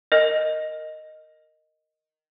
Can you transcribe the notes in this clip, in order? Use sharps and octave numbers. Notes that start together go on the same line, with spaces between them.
A#4 D#5